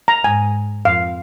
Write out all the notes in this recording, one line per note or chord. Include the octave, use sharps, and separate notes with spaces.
A#5
G#2 G#5
F2 F5